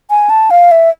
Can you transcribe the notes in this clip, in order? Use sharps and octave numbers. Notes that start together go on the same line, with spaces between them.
G#5
A5
F5
E5